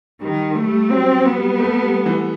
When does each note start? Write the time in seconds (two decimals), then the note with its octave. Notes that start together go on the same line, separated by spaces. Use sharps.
0.21 D#3 G3
0.56 A3
0.67 G3
0.90 F#3 C4
1.26 B3
1.37 G3
1.60 A3
1.82 G3
2.06 E3